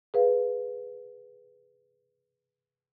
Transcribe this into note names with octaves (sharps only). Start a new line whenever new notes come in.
G#4 B4 F5